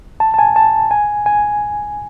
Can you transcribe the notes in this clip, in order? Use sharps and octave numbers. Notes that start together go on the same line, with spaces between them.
A5
A5
G#5
A5
G#5
G#5